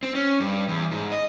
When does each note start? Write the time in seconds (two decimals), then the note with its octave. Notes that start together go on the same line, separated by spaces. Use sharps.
0.03 C4
0.15 C#4
0.40 G2
0.68 E2
0.91 G#2
1.12 D#5